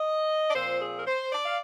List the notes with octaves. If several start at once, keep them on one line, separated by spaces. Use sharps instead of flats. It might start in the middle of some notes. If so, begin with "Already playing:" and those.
Already playing: D#5
D5
A#2 F3 C4 C5
G#4
A#4
C5
D5
F5